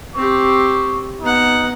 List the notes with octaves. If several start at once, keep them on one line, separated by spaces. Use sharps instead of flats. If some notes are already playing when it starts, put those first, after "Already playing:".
C4 G4 C#6
B3 D#4 F#5